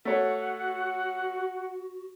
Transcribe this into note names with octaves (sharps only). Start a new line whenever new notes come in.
A3 F#4 C#5 F#5